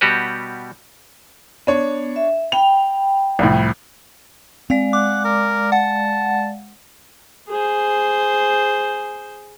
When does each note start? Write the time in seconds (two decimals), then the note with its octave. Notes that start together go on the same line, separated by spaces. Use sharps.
0.01 B2 G3 F#4 G4 B4
1.67 B3 D4 C#5
2.16 E5
2.52 G5 B5 F7
3.39 C2 F2 A2
4.70 G#3 C4 D5 F5
4.93 F#5 D6
5.25 A#4
5.72 F#5 A5
7.49 G#4 C5